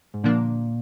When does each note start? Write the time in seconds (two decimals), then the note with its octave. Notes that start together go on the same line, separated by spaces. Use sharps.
0.14 G#2
0.24 A#2 D3 F3 A#3 D4